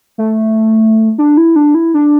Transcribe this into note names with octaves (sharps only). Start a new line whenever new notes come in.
A3
D4
E4
D4
E4
D4